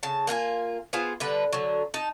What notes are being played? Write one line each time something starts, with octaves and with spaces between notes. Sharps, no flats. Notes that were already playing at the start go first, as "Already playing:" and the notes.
C#3 A5
A#3 D4 F4 G#5
B3 F4 G#4 C5
D3 G3 B4
D3 F#3
D#4 A5